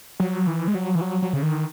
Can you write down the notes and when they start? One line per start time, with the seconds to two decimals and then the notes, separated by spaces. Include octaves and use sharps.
0.20 F#3
0.47 E3
0.68 G#3
0.75 F#3
0.95 E3
1.01 F#3
1.22 F#3
1.33 C#3
1.43 D#3